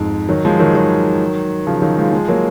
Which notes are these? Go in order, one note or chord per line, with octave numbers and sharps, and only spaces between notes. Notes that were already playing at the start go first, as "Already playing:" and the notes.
Already playing: F2 G#2
D#3 F#3
F3 G#3
D#3 F#3
D#3 F#3
C#3 F3
D#3 F#3
F3 G#3
F3 G#3
F#3 A#3